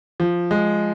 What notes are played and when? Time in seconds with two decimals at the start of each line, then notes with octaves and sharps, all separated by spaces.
0.20 F3
0.51 G#3